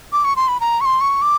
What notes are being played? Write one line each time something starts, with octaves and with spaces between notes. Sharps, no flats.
D6
C#6
C6
B5
A#5
C#6
C6
C#6
D6